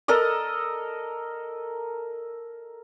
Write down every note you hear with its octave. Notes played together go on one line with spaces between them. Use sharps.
A4 A#4 D#5 D#6